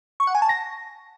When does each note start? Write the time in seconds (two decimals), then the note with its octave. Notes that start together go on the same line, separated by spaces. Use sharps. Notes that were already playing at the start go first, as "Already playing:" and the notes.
0.20 C#6
0.27 F#5
0.35 G#5
0.42 A5
0.49 A#6